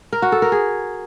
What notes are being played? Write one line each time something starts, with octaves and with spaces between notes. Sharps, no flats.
A#4
F#4
A4
A#4
G#4